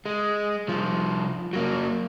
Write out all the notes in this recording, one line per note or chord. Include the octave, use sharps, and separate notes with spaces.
G#3
C2 F3
F#3 A#3